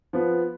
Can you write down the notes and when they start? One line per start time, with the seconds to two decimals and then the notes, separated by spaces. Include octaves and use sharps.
0.13 F3 B3